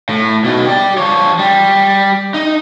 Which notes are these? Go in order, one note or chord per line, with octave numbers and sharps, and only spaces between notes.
A2
B2 D#4
G4 D5
F3 C#5
G3
D#4